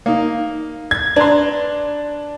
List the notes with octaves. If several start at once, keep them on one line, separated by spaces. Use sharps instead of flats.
A#3 D#4
G#6
D4 B4 A#5 C6